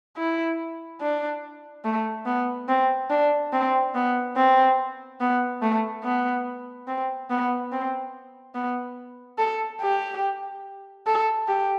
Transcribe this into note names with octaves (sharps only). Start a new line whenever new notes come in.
E4
D4
A3
B3
C4
D4
C4
B3
C4
B3
A3
B3
C4
B3
C4
B3
A4
G4
A4
G4